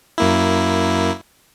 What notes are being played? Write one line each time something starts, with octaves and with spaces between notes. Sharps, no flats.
F#2 A#3 E4